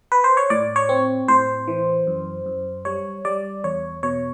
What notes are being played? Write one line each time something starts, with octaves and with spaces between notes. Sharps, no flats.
B4
C5
C#5
A2 D5
C#5
C4
A2 C5
E3
F#2
F#2
G3 C#5
G3 D5
E2 C#5
B2 C#5